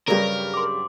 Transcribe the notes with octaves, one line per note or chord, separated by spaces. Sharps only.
G2 C#3 F#3 G3 A#4
C6 D6